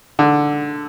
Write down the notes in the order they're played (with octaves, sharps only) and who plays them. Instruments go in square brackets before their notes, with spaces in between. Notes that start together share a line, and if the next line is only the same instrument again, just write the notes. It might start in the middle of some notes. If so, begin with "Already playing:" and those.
[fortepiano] D3